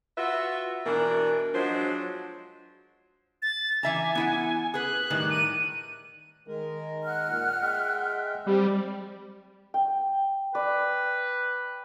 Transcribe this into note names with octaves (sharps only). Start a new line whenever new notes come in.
F4 F#4 B4 E5
B2 E3 D4 E4 A#4
F3 F#3 G#3 D4 C5
A6
E3 E5 G#5 A#5
B3 E4 F#5
G#4 B4 F#6
A2 D#3 G3
D#7
D#3 G#3 A#4
F#5 F6 F#6
A#2
G#3 E5 G5
G3 C4
G5
B4 D5